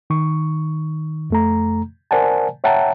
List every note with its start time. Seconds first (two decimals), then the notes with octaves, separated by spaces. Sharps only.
0.10 D#3 C#6
1.30 F2 A3 A#5
2.11 A#4 C5 D5 F#5 G#5 A5
2.64 C#5 E5 F#5 G5 A5 A#5